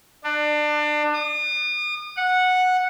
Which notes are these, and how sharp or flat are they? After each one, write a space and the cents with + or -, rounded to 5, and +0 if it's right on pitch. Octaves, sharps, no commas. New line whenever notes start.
D4 +25
D#6 -40
F#5 -10